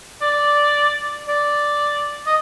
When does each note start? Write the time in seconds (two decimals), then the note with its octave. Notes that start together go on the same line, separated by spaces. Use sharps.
0.22 D5
1.28 D5
2.26 D#5